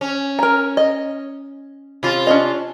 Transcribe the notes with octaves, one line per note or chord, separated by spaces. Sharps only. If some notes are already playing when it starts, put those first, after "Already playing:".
C#4
A#4 A#5
D#5
C3 F4
C#4 D4 D#5